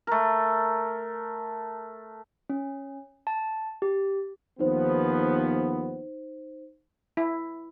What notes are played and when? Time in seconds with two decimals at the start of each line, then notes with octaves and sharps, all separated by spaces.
0.07 A3 A#4
2.50 C#4
3.27 A5
3.82 G4
4.59 D#2 F3 B3 D#4 C5
7.17 E4